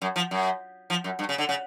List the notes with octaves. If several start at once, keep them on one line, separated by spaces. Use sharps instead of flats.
F#2
F3
F#2
F3
F#2
G2
C#3
D3
C#3